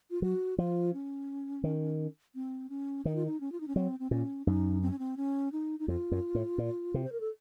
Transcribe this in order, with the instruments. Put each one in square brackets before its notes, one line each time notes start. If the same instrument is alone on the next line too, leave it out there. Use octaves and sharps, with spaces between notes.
[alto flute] F4
[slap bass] F#3 [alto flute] F#4
[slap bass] F3 [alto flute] F4
[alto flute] C#4
[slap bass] D#3
[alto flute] C4
C#4
[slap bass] D#3 [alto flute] D#4
[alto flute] F4
D#4
C#4
F4
D#4
C#4
[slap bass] F#3 [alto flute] C4
[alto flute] C4
[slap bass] A#2 [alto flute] C#4
[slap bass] F#2 [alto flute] D#4
[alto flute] C4
C#4
C4
C#4
D#4
D#4
[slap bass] F2 [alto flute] F4
[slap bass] F#2
A2
A#2
C3
[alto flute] C5
A#4
A4